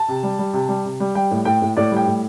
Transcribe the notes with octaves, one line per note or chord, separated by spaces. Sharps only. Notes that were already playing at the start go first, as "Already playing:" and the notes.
Already playing: A5
C3
G3
G3
C3
G3
C3
G3
G3 G5
A2
A2 G5
A2
A2 D5
G3 G5
A2